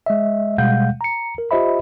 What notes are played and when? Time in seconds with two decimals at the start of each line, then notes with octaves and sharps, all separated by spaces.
0.06 G#3 D#5 E5
0.58 B2 G3 G#3 F5 F#5 G6
1.01 A#5 C#7
1.38 A#4
1.51 F4 G4 C5 D#5 E5 B5